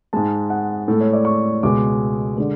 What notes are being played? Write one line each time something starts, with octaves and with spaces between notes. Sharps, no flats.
G#2 G#3 A5
F#5
A2 G#3 A4
C#5
D5
C#6
C#2 B2 G#3 D6
D3 G#3